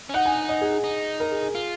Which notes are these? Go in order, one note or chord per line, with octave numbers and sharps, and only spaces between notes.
C#4
D#4 F#5
G#5
D#5
G#4
G#4
D#4
A#4
G#4
G#4
F4